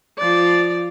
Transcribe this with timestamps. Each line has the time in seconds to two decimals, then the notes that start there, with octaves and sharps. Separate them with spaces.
0.18 F3 D5